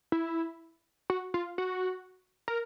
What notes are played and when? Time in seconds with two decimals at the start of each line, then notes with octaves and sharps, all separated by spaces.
0.12 E4
1.10 F#4
1.34 F4
1.58 F#4
2.48 A#4